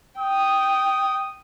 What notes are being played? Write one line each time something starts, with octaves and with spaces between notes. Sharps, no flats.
G5 D#6